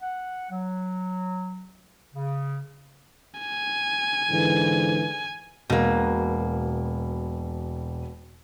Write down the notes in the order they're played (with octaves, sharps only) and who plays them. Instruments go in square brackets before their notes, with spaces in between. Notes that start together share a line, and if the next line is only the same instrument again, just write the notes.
[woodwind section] F#5
F#3
C#3
[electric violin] G#5
[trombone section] G#2 D3 E3
[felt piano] E1 [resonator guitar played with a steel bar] B2 A#3